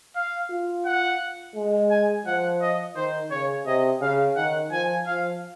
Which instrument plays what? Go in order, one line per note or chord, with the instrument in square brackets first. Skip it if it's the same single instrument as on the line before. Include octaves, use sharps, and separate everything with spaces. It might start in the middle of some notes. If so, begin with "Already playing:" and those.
[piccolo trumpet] F5
[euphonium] F4
[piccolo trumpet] F#5
[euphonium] G#3
[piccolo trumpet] G#5
[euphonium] F3 [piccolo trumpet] F#5
[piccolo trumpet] D#5
[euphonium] D#3 [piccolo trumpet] C5
[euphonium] C#3 [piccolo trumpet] C#5
[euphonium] C3 [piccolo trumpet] D#5
[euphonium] C#3 [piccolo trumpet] F5
[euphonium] D#3 [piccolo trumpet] F#5
[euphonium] F3 [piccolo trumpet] G#5
[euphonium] F3 [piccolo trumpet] F5